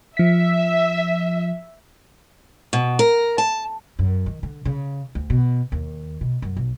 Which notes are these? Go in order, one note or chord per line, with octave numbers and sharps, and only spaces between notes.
F3 E5 B6
B2
A#4
A5
F#2
D#3
D3
C#3
D2
B2
D#2
B2
F#2
B1